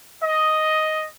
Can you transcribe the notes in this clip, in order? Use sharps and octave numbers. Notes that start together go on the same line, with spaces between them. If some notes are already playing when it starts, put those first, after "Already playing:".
D#5